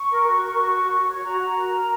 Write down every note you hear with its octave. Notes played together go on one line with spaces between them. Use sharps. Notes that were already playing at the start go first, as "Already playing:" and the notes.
Already playing: C#6
A#4
F#4
A#4
F#4
F#4
F#4
C#5
F#4 A#5
F#4
A#4
A#4